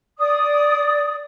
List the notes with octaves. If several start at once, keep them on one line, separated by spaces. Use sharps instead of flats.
D5 D#6